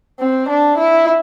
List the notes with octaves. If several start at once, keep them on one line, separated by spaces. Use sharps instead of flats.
C4
D4
E4